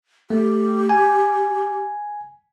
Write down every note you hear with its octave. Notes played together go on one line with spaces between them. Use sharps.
A3 G4
G#5